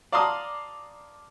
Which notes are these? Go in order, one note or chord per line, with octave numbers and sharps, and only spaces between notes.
D5 F5 A5 A#5 C6 D#6